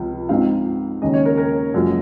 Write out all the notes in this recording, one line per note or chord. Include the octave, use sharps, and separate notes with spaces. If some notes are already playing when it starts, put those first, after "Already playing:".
Already playing: C#2 C3 F3
G#2 F3 G#3 C4 D#4 F5
D#2 C#3 G#3 D#5
C#5
A#4
A#4
F#1 F#2 F3 G#3